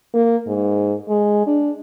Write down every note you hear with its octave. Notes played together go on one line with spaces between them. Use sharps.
A#3
G#2
G#3
D4